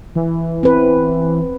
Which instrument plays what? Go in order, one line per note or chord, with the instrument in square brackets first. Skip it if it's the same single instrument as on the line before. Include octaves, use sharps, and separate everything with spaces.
[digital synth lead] E3
[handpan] C4 B4